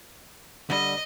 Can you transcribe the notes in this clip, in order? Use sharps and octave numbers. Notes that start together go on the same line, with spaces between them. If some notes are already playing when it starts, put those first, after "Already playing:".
D3 G3 D#5